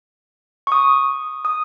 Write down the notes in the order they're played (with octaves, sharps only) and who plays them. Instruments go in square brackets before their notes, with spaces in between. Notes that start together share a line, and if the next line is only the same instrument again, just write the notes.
[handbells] C#6
D#6
D#6